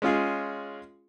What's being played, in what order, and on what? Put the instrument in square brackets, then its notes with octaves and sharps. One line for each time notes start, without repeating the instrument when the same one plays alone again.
[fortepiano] G#3 C#4 F4 G#4